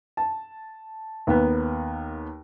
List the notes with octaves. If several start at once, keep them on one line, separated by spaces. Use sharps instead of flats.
A5
D#2 A#3 B3